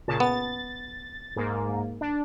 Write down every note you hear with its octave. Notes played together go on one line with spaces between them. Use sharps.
A#2 C#3 A5
B3 A6
G#2 A#3
D4